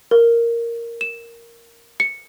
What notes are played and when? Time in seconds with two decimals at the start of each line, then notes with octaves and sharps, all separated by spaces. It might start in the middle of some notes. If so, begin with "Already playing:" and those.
0.11 A#4
1.01 E7
2.00 C#7